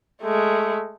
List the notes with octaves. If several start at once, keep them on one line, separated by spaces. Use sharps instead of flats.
G#3 A3